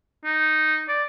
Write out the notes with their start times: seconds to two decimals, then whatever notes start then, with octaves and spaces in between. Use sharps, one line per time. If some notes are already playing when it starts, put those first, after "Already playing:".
0.25 D#4
0.89 D5